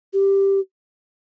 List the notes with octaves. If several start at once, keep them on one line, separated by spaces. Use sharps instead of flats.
G4